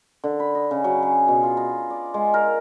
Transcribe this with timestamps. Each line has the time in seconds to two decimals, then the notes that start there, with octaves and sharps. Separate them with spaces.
0.24 D3
0.40 B5
0.55 D#5
0.71 C#3
0.84 F#3
1.03 G#4
1.28 B2
1.43 F4
1.57 A#5
1.90 D5
2.14 G#3
2.34 A#4